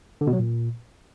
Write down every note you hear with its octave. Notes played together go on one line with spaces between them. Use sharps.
D3
B2
F#3
A#2